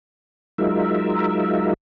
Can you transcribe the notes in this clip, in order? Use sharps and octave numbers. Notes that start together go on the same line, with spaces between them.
F#3 G#3 D#4 F4 A#4 E5